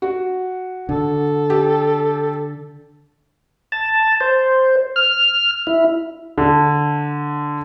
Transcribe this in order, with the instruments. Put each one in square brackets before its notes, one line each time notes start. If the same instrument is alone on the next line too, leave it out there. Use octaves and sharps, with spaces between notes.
[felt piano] F#4
[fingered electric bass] D3 [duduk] A4
[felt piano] G4
[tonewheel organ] A5
C5
F6
E4
[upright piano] D3